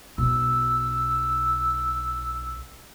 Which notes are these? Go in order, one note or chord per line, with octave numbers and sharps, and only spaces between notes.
B1 E6